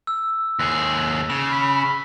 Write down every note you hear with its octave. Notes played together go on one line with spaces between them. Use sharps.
E6
D#2 G#4 F#6
C#3 E7
B5